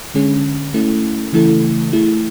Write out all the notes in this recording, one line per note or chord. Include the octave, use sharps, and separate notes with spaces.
D3 G#3 C#4 G#4
A3 C#4 E4 A4
C#3 E3 A3 E4 A4
A3 E4 G#4